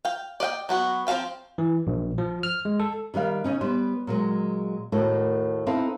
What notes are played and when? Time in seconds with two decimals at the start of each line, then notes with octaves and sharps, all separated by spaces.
0.05 F5 G5
0.40 D5 D#5 F5 G5
0.69 F#3 B3 F#4
1.07 F3 C4 A4 F5 G5
1.58 E3
1.87 A#1
2.18 F3
2.43 F6
2.65 G#3
2.80 A4
3.14 D#3 G3 B4 F5
3.44 C#3 C#4 D#4
3.61 G3 B3 B4 C5
4.07 A#2 F#3 G#3
4.92 D#2 A2 A3 A#3 F#4
5.66 C4 D#4 E4 A4 B4 F5